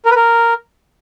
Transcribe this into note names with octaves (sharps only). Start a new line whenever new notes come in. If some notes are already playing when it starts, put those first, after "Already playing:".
A#4
B4
A#4